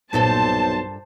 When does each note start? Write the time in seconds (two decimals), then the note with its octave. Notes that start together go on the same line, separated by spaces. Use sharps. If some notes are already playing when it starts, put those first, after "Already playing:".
0.13 B1 G2 A#2 A4 C5 A5